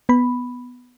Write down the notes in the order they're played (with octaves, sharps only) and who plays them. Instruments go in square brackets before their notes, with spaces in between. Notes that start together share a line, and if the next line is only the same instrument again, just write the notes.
[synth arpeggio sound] B3 B5